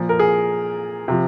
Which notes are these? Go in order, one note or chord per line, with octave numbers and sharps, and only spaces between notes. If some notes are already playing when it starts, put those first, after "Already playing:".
Already playing: A#2 F3
A#4
G#4
C3 F3